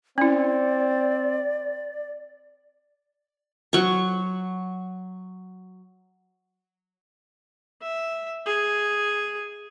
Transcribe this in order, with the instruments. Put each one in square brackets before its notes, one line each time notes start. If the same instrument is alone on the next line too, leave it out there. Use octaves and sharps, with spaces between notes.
[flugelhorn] C4 [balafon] C#4 E4 [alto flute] D5
[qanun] F#3 C#6
[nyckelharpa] E5
G#4